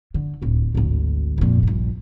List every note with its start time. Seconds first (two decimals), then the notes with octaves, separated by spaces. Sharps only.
0.14 D3
0.42 D1 C#2
0.75 G#1 D2
1.38 F2 A#2
1.63 A#1 G2